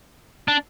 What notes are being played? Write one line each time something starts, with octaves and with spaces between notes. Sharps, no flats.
D4